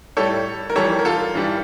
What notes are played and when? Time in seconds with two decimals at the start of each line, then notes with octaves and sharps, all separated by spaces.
0.17 A2 G3 A4 C#5
0.70 A#4
0.75 F2 E3 G3 A4 C#5
0.99 A#4
1.05 F4 A4
1.34 G2 E3 G3